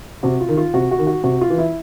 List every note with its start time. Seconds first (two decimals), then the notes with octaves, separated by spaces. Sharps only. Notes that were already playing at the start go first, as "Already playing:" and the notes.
0.23 C3 F#4
0.41 F4
0.49 D#3
0.57 F4
0.74 C3 F#4
0.91 F#4
0.99 D#3
1.07 F#4
1.24 C3 F#4
1.41 F4
1.50 E3
1.58 E4